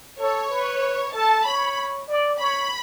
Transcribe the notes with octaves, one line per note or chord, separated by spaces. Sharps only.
A4 C#5
B4
A4 A5
C#5 B5
D5
C#5 B5